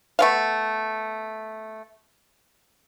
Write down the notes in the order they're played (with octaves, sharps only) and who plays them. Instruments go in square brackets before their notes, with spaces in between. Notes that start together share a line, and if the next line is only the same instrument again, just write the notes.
[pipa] A3 B3 F5